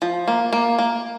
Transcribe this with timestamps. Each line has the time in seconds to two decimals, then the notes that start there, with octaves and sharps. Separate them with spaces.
0.02 F3
0.28 A#3
0.53 A#3
0.79 A#3